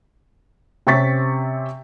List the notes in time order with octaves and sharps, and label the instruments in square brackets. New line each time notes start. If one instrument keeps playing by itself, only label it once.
[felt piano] C3 C4 C#4 C#6 A6 B6